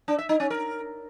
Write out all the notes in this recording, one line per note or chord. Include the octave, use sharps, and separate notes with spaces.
D4
E5
D#4
C#4
A#4